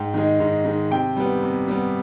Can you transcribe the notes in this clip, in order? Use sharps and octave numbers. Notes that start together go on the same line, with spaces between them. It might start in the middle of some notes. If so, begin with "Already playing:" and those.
Already playing: G#2 G5
D#3 G#3
G#2
D#3 G#3
C3 G5
G3 B3
C3
G3 B3